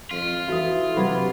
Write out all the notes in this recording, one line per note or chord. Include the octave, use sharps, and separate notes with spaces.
F2 F4
E3 E4 F#4 A4 E5 D#6
C3 F#3 D4 B4 B5 G#6